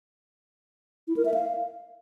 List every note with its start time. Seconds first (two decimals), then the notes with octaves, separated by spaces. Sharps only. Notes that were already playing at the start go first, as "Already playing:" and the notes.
1.08 E4
1.16 A#4
1.25 E5
1.34 F5